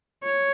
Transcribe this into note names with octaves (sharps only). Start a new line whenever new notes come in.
C#5